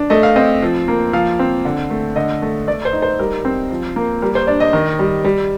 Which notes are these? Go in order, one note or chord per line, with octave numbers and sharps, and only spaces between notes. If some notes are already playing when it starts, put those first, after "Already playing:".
Already playing: D4
A3 D#5
F5
C4 D#5
F3
A#3
F3 F5
C4
D3
A3
D3 D#5
A3
A3 D5
C5
D#4
C5
G3 A#4
C4
F3
A#3
G3 A#4
C5
D4 D5
D#5
D#3
G3
G3